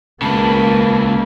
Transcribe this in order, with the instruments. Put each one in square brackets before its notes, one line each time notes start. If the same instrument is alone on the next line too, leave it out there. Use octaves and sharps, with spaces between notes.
[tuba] C#2 [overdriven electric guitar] C#3 B4 [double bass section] A#3 [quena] A5